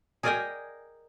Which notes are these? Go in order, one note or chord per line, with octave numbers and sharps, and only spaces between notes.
G#4 A#4 D5 D#5 G5 G#5